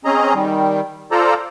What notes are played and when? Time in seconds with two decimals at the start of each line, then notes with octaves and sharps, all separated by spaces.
0.05 C4 C#4 G#4 D#5 A#5
0.34 D#3 G3
1.11 F4 A4 C5 D5 A#5